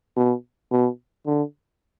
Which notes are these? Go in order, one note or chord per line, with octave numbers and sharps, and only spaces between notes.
B2
B2
D3